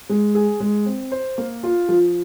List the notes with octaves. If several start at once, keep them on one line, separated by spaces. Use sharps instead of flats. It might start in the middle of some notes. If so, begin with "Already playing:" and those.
G#3
G#4
G#3
C4
C5
A#3
F4
F3